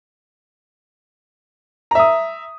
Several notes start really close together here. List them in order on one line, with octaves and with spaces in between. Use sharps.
A#5 E5 D#6